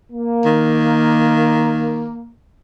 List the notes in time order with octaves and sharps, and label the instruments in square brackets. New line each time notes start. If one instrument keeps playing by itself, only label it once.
[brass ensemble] A#3
[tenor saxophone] D#3